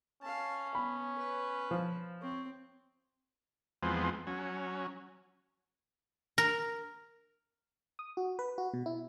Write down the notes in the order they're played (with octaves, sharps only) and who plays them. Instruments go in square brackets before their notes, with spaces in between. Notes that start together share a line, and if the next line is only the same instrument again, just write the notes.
[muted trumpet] C#4 [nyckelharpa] F5 A5
[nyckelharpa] B3 [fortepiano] B5
[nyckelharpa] B4
[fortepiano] F3
[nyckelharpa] C4 [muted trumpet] C#5
[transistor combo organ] E2 F3 G#3 B3 C4
F#3 C#4
[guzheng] A#4
[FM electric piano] D#6
F#4
B4
F#4
B2
E4